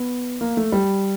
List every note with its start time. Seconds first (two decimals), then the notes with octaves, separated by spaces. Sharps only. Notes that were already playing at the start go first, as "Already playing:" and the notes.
Already playing: B3
0.41 A#3
0.57 A3
0.72 G3